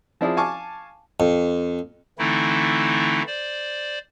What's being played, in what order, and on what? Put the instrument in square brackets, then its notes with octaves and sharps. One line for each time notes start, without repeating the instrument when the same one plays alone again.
[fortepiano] F3 C4 E4 G#4 D5
F5 G#5 A5 C#6 D6
[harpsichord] F2
[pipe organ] D3 E3 A3 C4 D#4 E4
C5 D5